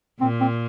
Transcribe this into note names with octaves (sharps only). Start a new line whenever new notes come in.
A#2 C4
C4